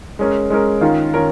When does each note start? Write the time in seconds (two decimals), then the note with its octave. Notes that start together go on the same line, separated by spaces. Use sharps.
0.19 G#3 C#4 A#4
0.50 G#3 C#4 A#4
0.81 D#3 C#4 F4 A#4
1.14 D#3 C#4 F4 A#4